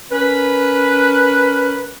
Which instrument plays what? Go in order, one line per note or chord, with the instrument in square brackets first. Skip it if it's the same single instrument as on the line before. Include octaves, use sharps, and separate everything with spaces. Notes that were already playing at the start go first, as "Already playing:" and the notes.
[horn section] C#4 A#4 B4